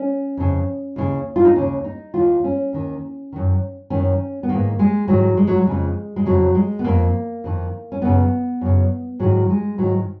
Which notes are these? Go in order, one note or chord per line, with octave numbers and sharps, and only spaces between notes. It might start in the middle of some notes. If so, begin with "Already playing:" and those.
Already playing: C#4
F2 C#3
D#2 C#3
F4
D#4
D#2 C#3 C#4
D#4
D#2 D#3 F4
C#4
D#2 D#3
F#2 D#3
F#2 D#3 C#4
B3
G#2 D#3 A#3
G#3
G#2 D#3 F#3
G#3
F#3
G#3
F2 C#3
G#3
F2 C#3 F#3
G#3
B3
F2 D#3 A#3
F2 D#3
C#4
F#2 C#3 B3
F#2 C#3
G#2 D#3 F#3
G#3
G#2 D#3 F#3